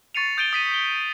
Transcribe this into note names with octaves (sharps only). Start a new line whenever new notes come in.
C#6 A6 C7 C#7 D#7 F7
D#6 G6 A6 D7 D#7 G7
D#6 B6 D#7
G7